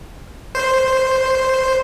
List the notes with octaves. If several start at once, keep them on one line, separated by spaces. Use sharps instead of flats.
C5